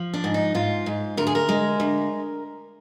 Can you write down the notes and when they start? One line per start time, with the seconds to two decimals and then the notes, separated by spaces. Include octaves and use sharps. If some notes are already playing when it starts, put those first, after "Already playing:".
Already playing: F3
0.14 D4
0.24 G#2
0.34 D#4
0.55 G#2 F4
0.86 G#2
1.17 D2 A#4
1.27 G#4
1.35 A#4
1.49 G#3
1.80 D2